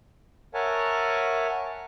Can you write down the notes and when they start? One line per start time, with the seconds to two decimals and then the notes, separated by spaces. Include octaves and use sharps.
0.54 A#4 C#5 E5 F#5 G#5 A5